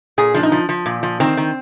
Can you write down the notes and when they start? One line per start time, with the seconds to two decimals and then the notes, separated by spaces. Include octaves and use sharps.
0.18 A#2 G#4
0.34 F3 D4
0.43 D#4
0.52 F3
0.69 F3
0.86 A#2
1.03 F3
1.20 D#3 C4
1.37 D#3